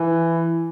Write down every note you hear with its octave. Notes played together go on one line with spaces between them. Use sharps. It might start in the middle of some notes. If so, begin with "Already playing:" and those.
Already playing: E3